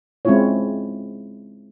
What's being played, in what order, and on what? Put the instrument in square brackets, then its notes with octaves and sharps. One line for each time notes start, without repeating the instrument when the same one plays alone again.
[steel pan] G#3 C4 C#4 E4 F4 C#5